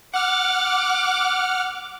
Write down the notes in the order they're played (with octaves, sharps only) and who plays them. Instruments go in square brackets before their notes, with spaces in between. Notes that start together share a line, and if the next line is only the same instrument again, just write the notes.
[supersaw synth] F#5 F6 [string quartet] D6